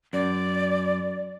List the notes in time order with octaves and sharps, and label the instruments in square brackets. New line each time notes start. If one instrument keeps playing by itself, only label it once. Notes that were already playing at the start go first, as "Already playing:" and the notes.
[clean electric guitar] F#2 [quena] D5